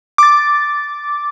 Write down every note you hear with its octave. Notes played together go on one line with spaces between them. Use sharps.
D6 A6